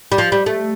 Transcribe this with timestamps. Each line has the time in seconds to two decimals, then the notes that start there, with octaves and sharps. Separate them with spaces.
0.12 G3
0.18 F3
0.32 G3
0.46 A3